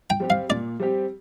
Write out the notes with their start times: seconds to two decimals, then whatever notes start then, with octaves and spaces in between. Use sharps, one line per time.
0.10 G5
0.20 G3 C4 G4
0.30 F5
0.49 A#2 D5
0.80 G3 C4 G4